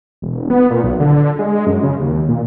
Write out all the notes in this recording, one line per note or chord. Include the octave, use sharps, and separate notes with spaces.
E1
B3
A#2
B1
D3
G#3
F#2
C#3
D#2
A#2